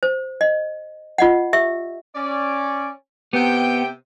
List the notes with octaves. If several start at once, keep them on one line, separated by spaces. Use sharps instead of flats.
C5
D#5
F4 D#5 F#5
G4 E5 E6
C#4 D5
C3 B3 G4 G5